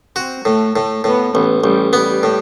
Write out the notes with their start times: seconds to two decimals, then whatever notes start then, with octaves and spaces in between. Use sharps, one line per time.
0.16 C4 F#4
0.45 A2 A3
0.75 A2 A3
1.04 A2 B3
1.35 A1 B3
1.64 A1 G3 G4
1.93 G3 B3 G4
2.23 A2